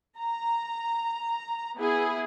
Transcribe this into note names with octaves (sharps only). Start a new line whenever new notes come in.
A#5
B3 E4 G#4